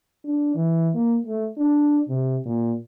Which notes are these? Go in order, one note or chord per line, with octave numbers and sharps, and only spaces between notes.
D4
E3
A#3
A3
D4
C3
A#2